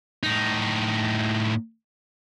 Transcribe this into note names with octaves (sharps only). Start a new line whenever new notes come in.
A2 D#4